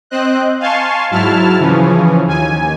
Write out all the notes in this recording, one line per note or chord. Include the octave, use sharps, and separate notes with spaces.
C4 C5 D#5 F#6
F5 G#5 A5 C6 C#6
G#2 F#3 E4 A5 F6
C#3 E3 F3 C#4
D#2 G#5